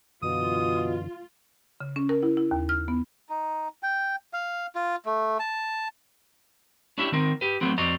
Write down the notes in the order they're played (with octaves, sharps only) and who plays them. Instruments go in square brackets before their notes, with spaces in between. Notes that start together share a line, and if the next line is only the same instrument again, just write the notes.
[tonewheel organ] F#2 D3 E3 [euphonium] B2 [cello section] F4 [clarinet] D#6
[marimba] C#3
C#4
A#4
E4
E4
D#2
F6
B3
[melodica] D#4
G5
F5
F4
A3
A5
[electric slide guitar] C#4 D4 E4 G4 E5
D#3 C4 A#4
G4 B4
F#3 A3 B3 C4
F2 C4 F#4 D5 D#5 A#5